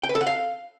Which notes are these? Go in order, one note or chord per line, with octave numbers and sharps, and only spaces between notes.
G5
B4
A4
F#5
F5